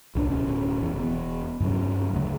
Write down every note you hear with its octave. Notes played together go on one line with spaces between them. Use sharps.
C2 B2 C#4 D4
D1 B2 C#4
E2 B2
E1 E2 B3
G2 C3 F#3 C#4
D2 C#3